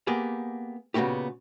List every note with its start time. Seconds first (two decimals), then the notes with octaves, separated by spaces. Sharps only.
0.07 A#3 B3 G4 G#4
0.94 A#2 C#3 B3 C#4 F#4 G4